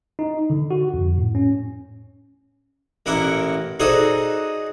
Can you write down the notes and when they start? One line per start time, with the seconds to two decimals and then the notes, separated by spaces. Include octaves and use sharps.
0.19 D#4
0.50 D3
0.71 F#4
0.94 F2
1.18 A2
1.35 C#4
3.06 A1 A#3 E4 F#5 D6
3.80 D#4 F#4 G#4 A4 C5 D5